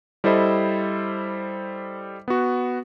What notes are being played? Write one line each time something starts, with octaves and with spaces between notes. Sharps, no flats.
G3 E4 A4 C5 D#5
B3 F#4